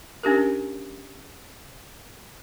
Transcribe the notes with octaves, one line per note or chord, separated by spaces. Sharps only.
C#4 D4 G4 A#4